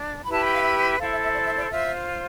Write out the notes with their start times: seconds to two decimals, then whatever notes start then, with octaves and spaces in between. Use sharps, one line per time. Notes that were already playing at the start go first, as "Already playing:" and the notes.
Already playing: D4
0.24 E4 G4 B4 B5
0.34 A5
0.44 G5
0.54 F5
0.64 E5
0.99 E4 A4 C5 F5
1.11 E5
1.23 E5
1.35 D5
1.46 E5
1.58 D5
1.70 F4 C5 E5